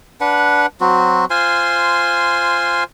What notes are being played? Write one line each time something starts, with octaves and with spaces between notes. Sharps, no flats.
D4 B4 F#5
F#3 C4 F#4
F4 C5 G#5 C6